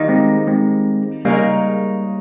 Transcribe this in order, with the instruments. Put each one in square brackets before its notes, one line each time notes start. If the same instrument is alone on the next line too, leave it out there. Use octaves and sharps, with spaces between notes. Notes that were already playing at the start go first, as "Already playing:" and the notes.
Already playing: [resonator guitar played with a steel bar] D#3 G3 A#3 D#4
[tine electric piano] G#3 C4
G#3 C4
[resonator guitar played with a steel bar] C#3 G#3 D#4 A#4 [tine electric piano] G3 A#3